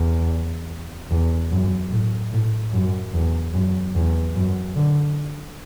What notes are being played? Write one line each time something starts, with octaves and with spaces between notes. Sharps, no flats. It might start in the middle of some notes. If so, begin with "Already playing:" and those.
Already playing: E2
E2
F#2
A2
A2
F#2
E2
F#2
E2
F#2
D3